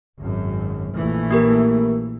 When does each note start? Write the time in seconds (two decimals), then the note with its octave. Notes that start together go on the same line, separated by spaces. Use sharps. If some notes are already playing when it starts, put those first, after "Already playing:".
0.19 G#1 F#2
0.94 A#1 E3 A3
1.31 A#3 G4 A#4